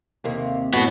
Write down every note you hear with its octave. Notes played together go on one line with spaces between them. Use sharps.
D#2 C3 A#3
F#2 A2 B3 F#4